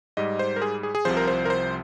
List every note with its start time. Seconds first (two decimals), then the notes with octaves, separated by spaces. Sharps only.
0.17 G#2 G3 D#5
0.39 C5
0.56 A#4
0.62 G#4
0.83 G#4
0.95 G#4
1.05 C2 C3 F3 C5
1.17 A#4
1.27 C5
1.45 A#4
1.50 C5